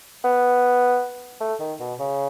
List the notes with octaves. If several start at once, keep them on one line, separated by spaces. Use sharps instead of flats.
B3
A3
D#3
B2
C#3